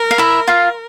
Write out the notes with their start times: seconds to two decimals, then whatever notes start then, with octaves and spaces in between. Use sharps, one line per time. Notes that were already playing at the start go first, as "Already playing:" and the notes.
Already playing: A#4
0.11 F5
0.18 E4 E5
0.47 F4 F5